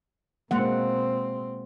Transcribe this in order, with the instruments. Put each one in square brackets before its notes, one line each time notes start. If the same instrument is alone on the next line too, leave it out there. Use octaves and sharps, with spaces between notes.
[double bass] B2 C4 [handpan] G#3 A#3 F#5